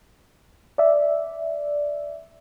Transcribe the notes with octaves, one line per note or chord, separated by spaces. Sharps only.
D5 E5